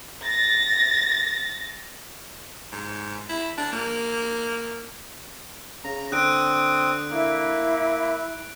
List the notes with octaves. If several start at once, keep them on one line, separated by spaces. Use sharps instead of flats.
A6 A#6
G#2
E4
D4
A#3
C#3 A#5
D3 C4 D#6 F#6 D7
A#3 E4